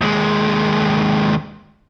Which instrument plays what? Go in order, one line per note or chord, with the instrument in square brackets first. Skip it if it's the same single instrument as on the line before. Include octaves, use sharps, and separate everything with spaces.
[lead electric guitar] D#2 G#3